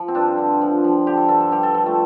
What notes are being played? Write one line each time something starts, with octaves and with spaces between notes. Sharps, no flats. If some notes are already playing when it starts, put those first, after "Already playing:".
Already playing: F3
C4
G2 D4
D3
F3
F3
D3 G4
A4
G2 A4
A4
G2 G4
A4
F3 A4
A3